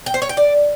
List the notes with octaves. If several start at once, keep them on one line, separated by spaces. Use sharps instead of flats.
G5
C5
C#5
G5
D5